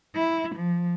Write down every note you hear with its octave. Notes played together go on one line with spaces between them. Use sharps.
E4
F3